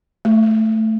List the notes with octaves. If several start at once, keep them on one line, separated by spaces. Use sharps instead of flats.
A3